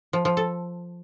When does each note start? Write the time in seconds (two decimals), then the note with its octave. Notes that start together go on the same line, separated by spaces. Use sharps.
0.13 F3
0.25 F3
0.37 A4